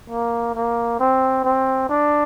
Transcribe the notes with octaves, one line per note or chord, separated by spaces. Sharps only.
A#3
A#3
C4
C4
D4